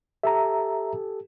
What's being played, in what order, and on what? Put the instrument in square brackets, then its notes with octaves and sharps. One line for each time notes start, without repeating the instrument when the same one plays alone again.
[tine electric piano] G4 A4 [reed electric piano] E5 A#5